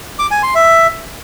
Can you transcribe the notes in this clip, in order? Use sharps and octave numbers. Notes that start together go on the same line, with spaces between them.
D6
G#5
C6
E5